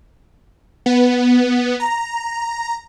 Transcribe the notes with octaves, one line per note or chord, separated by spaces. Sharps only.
B3
A#5